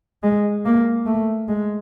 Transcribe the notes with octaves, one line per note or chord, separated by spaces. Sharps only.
G#3
A#3
A3
G#3